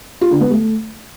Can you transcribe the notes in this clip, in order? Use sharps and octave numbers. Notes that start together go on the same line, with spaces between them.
F4
D3
B3
A3